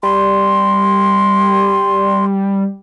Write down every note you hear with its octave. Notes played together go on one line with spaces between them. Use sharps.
G3 C6